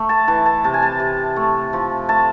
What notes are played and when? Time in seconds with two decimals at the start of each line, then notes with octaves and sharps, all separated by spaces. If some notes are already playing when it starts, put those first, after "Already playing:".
Already playing: A3
0.09 A5
0.28 E3 A5
0.46 A5
0.64 C3 A5
0.74 G#5
0.83 A5
1.00 C3
1.36 A3
1.73 F3
2.09 A3 A5